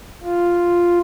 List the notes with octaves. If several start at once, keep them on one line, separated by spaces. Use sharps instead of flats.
F4